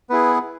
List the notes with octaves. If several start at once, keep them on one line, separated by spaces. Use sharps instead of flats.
B3 E4 G#4 B4